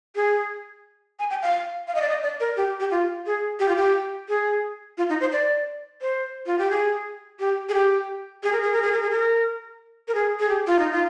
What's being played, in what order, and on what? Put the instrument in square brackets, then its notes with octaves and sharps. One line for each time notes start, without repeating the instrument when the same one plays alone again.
[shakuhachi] G#4
G#5
G5
F5
F5
D#5
D5
D#5
D5
A#4
G4
G4
F4
G#4
G4
F4
G4
G#4
F4
D#4
C5
D5
C5
F4
G4
G#4
G4
G#4
G4
G#4
A#4
G#4
A#4
G#4
A#4
G#4
A#4
A#4
G#4
G#4
G4
F4
D#4
F4